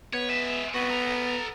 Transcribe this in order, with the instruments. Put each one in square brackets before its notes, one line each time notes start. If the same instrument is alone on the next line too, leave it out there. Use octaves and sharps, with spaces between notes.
[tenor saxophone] B3 [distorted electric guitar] C#5
[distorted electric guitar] G#3 E5
[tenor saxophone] B3 [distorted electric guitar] C4 F#4
[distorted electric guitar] A4 A#5